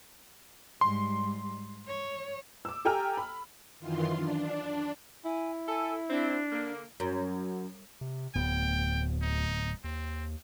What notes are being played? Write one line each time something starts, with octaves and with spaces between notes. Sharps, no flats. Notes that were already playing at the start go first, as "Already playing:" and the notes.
G#2 G3 C6
C#5
D6 E6
G4 A4 G5 G#5 A#5 F6
B5
F#2 D#3 E3 F4 C6
D4
E4 G#5
A4 G#5
C4 D4
D3 A#3
F#2
C3
D1 D2 B3 G5
D#4
D#2 C4